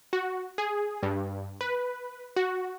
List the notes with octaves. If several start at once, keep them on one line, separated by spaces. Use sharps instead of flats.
F#4
G#4
G2
B4
F#4